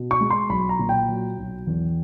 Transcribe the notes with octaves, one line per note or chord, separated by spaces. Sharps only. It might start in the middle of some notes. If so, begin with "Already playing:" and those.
Already playing: B2
C#6
G#3
C6
B1 B5
A#5
A#2
G5
F#3
B1
E2